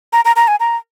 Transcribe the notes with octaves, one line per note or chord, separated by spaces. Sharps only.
A#5
A#5
A#5
G#5
A#5